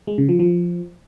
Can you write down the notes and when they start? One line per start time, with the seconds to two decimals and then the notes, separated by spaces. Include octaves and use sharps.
0.07 G#3
0.18 C#3
0.29 F3
0.39 F3